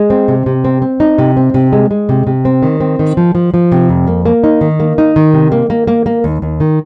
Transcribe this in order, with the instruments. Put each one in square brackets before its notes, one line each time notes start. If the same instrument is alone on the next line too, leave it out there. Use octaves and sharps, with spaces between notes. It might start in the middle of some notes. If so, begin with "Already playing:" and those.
Already playing: [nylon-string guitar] G#3
C4
C3
C3
C4
C4
D#4
C3
C4
C3
G#3
G#3
C3
C3
C4
D#3
C4
D#3
F3
F3
F3
C3
F2
A#3
A#3
D#4
D#3
A#3
D#4
D#3
C3
A#3
A#3
A#3
A#3
D#2
D#2
D#3